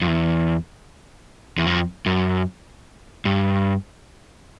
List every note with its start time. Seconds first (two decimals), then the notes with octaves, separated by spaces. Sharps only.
0.01 F2
0.08 E2
1.58 E2
1.67 F2
2.06 F#2
3.25 G2